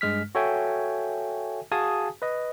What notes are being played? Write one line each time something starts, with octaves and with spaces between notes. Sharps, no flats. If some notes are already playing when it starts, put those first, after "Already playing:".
G2 G#3 F6 B6
F#4 A4 C#5 E5 G5 G#5
F#4 G#4 F5 G#5 A5 D#6
B4 D#5